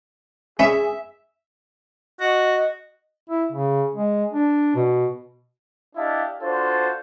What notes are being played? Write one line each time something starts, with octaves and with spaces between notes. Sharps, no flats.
C#4 G#4 E5 B5
F#4 D#5
E4
C#3
G#3
D4
B2
D4 E4 G4 D#5 F5 A5
D4 F4 F#4 A4 C5